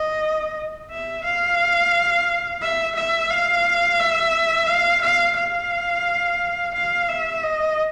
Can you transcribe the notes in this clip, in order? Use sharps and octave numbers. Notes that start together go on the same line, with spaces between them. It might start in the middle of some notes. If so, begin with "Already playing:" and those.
Already playing: D#5
E5
F5
E5
E5
F5
E5
F5
F5
F5
F5
E5
D#5